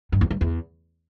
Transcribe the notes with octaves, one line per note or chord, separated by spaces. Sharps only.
G2
E2
G2
E2